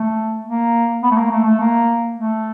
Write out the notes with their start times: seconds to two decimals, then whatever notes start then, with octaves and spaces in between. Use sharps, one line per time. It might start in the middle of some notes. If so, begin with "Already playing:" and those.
Already playing: A3
0.46 A#3
1.03 B3
1.11 A3
1.17 A#3
1.31 A3
1.45 A3
1.60 A#3
2.16 A3